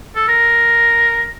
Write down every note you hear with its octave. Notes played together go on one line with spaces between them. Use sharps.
A4
A#4